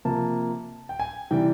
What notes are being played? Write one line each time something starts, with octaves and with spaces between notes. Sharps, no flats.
C3 F3 A#3 A5
G5
G#5
C3 E3 G3 G5